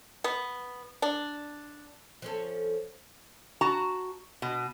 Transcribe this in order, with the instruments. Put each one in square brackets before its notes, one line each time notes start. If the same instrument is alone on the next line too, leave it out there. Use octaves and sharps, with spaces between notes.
[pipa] B3
D4
[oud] F3 C#4 A4
[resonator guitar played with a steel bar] F#4 A5 A#5
B2